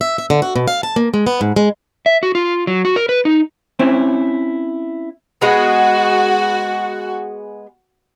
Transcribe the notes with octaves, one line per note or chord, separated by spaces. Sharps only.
E5
E5
D3
F#4
B2
F5
A5
A#3
G#3
B3
G#2
G#3
E5
F#4
F4
F#3
F#4
A#4
B4
D#4
C4 C#4 E4 C5
G#3 B3 F#4